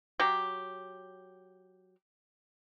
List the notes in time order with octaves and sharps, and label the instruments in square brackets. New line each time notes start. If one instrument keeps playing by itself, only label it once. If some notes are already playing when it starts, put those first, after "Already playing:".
[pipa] F#3 G4